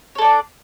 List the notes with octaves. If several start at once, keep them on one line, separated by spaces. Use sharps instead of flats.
D4 A4 C#5 D5